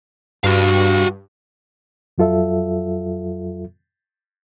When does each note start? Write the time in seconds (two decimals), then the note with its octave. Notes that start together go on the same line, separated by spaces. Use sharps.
0.44 G2 F#4 F5
2.18 F2 F#3 F4 A4 E5